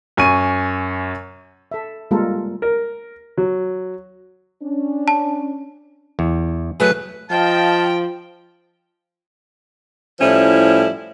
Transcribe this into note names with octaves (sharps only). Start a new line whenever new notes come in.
F#2 G#5 C#6 D#7
A4 E5
G3 G#3 A#3 F4 A4 A#4
A#4
F#3
C#4 D4
A5
E2
F#3 A3 G#4 B4
F3 D#5 F5 G5 A5
A2 F3 G3 C#4 E4